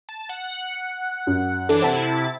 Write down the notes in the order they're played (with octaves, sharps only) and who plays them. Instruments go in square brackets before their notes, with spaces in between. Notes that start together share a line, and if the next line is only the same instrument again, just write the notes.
[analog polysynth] A5
F#5
[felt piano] F#2
[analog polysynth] E3 D4 D6 [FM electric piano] A4
[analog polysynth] C3 E4 A6 [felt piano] C5 F#5 A5